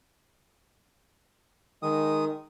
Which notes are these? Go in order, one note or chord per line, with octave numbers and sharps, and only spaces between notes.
D#3 G#3 D#6